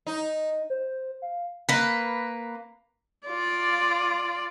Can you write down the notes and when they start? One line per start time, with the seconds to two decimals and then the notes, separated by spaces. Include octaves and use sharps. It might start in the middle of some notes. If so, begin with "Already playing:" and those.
0.07 D#4
0.70 C5
1.22 F5
1.69 A#3 B4
3.27 F4 D5